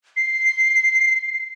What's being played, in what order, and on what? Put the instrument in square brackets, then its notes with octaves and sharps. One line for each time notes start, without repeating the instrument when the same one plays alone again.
[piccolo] C7